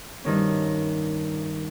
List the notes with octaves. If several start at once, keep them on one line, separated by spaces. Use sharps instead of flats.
G2 D#3 C#4